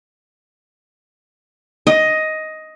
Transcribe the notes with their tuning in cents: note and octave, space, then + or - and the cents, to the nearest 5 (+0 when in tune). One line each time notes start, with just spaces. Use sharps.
D#5 +10